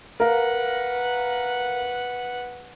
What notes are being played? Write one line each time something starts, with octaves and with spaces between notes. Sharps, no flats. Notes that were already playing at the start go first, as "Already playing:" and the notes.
A#4 B4 F5 F#5